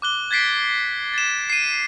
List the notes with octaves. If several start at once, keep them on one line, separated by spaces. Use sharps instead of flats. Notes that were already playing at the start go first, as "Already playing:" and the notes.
D6 F#6 G7
G#6 A6 B6 C7 D7
A6 E7
C7 D#7